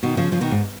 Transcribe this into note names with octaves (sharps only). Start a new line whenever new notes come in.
B2 D#3
C#3 F3
C#3 F3
B2 D#3
G#2